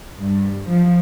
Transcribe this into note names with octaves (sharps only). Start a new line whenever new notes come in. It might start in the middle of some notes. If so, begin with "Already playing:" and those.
G2
F3